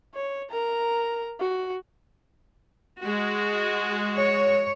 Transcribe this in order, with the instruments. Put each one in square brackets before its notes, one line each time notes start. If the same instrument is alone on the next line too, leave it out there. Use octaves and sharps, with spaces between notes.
[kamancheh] C#5
A#4 A#5
F#4
[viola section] G#3 F#4
[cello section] C#5